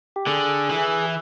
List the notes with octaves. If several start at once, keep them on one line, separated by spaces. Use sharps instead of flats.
G4
D3 G#4
E3